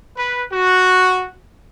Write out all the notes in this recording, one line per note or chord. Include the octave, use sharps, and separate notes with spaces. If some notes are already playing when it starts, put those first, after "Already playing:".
B4
F#4